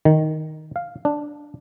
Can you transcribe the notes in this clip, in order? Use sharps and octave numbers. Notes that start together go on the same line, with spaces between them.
D#3
F5
D4